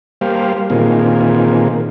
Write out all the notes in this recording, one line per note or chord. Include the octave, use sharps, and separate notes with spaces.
G3 A#3 G4 C5 F5
A#2 D#3 A#3 C4 F4 G#4